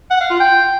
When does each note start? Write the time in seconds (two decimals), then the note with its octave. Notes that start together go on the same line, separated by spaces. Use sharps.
0.11 F#5
0.20 F5
0.30 F4
0.40 G5